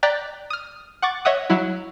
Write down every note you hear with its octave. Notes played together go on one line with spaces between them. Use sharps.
D5 G5 A#5 F#6 B6
D#6 F6
F#5 C#6 D6 A6
C#5 D#5 E5 F#5 D#6
F#3 E4